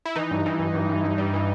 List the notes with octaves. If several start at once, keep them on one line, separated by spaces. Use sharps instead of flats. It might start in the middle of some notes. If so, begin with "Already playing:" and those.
E4
E3 D#4
G2
E3
G2
G2
G2
G2
G3
E3